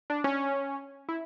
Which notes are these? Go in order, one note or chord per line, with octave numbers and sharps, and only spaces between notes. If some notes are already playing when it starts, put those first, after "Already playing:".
D4
C#4
E4